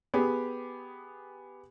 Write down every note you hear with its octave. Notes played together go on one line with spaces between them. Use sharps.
B3 G4 G#4